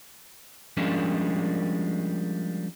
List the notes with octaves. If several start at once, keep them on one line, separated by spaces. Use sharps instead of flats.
F3 G3 G#3 A#3 C#4 D4